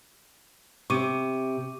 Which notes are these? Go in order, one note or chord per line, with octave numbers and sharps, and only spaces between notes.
C3 C#6 D6 D#7